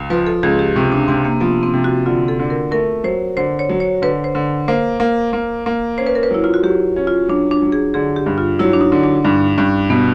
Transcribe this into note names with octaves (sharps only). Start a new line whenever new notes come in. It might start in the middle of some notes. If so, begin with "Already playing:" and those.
Already playing: C#2
F3 B4
A4
C#2 G#4
G4
C3 C#4
D4
C3 C4
A#3
F3 B3
C4
C3
F#4
D3 F4
A4
D3
A#4
A3 A#4
F#3 C5
D3 C5
C#5
F#3
C#5
D3 B4
C5
D3
A#3 C5
A#3
A#3
A#3
C#4 C5
B4
A#4
B4
F#3 E4
F4
F#4
F#3 G4
C#4
F4
F#3 D4
D4
F#3
G#4
D3 G#4
G4
G2
F4
F#3 E4
D4
D#4
D3
D4
G2 D4
G2 C#4
B2 B3